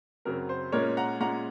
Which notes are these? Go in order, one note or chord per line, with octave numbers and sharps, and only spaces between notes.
F#2 C#3 F#3 C4 A#4
C5
A#2 G#3 C#4 A#4 C#5
F#5 A#5
A#2 G#3 C#4 F#5 A#5